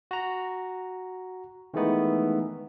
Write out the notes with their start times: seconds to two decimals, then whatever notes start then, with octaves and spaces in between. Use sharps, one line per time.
0.11 F#4 A#5
1.74 D#3 E3 G#3 A3 B3 D#4